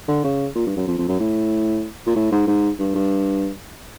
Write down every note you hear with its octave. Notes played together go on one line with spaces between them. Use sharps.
D3
C#3
A#2
G2
F#2
F2
F2
F#2
A2
A#2
A2
G#2
G#2
G2
G2